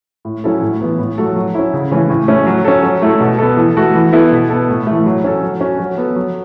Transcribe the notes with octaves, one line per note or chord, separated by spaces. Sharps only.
A2
F#3 C#4 E4 A4
A2
E3 B3
A2
F#3 A3 F#4 A4
F#3
C#4 E4
C#3
E3 A3 C#4
A2
A3 C#4
F#3
C#4 A4
F#3
A3 E4 A4
B2
B3 A4
E3
A3 F#4 A4
E3
B3 E4 A4
B2
B3 A4
A2
E3 A3
F#3
C#4 A4
F#3
C#4 F#4
F#3
B3 A4
F#3